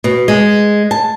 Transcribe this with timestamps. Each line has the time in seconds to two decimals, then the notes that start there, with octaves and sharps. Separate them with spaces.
0.04 B2
0.28 G#3
0.91 A5